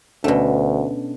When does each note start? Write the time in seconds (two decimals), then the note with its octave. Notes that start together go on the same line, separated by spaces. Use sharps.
0.24 D2 B2 A3 C#4 D4